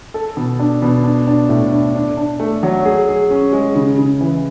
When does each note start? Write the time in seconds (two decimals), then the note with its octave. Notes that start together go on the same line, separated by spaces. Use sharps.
0.14 A4
0.37 B2
0.59 D4
0.82 B2
1.04 D4
1.27 D4
1.49 A2
1.72 D4
1.94 D4
2.17 D4
2.40 A3
2.63 F#3
2.85 G#4
3.08 G#4
3.31 C#4
3.53 G#3
3.75 C#3
3.98 C#3
4.21 E3